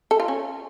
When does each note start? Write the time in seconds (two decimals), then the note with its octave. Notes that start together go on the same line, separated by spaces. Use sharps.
0.11 A4
0.20 F4
0.28 C#4